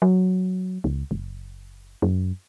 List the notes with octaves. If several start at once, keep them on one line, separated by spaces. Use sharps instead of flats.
F#3
C#2
F#1
F#2